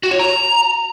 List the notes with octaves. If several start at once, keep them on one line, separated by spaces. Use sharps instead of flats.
F#4
C#5
A#5